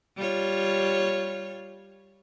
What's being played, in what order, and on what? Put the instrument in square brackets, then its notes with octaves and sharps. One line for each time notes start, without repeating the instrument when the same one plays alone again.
[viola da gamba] G3 F4 C#5